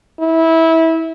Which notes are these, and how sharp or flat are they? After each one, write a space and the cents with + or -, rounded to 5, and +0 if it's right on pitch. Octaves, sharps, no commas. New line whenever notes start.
E4 -20